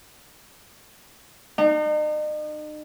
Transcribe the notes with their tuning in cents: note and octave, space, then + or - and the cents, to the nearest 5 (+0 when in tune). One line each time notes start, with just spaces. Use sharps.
D#4 -40